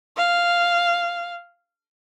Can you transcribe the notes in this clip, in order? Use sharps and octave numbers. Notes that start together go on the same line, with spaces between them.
F5